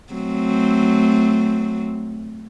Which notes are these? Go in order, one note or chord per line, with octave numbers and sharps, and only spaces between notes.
F#3 A3 C4